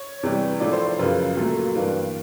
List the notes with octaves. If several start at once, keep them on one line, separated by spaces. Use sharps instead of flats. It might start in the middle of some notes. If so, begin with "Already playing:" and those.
Already playing: C#5
E2 C3 E3 G3
A2 F3 A3 D5
C5
C5
F#2 C#3 F3 B4
A#2 F#3 A3
G2 E3 G3 A#3 B4